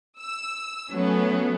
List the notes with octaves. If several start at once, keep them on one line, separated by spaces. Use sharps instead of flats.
E6
F#3 A3 B3 C#4